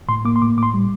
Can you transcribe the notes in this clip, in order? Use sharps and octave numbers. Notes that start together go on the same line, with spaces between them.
A2 C6
A#3 D6
C6
A2 D6
A2 D6
C6
G3